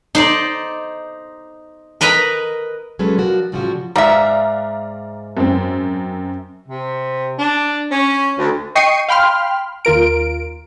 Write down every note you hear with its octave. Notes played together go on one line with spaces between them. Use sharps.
D#4 C5 D5
A#4 B4 D#5 A#5 B5
F#3 G#3 C#4 A4 B4
F3 D4 F#4 A#4
A2 C#3 F3 G3 F4 F#4
G#2 D5 E5 F5 A#5
F#2 C4
C3
D4
C#4
D2
D#5 G5 C#6 C7 C#7 D#7
F5 G5 B5 C6 F6
D#2 F4 A#4 D7